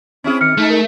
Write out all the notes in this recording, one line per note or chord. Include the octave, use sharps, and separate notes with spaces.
C4 C#4 E4 G#4
D#3 F6 C#7
G#3 A3 D#4
A#4